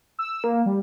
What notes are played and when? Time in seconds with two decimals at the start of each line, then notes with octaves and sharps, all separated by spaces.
0.19 E6
0.44 A#3
0.66 G3